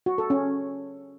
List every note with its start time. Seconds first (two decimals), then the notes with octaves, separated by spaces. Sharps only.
0.06 F#4
0.18 A4
0.30 C#4